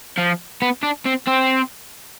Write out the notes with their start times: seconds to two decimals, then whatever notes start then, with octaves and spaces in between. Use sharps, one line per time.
0.18 F3
0.62 B3
0.83 D4
1.06 C4
1.27 C4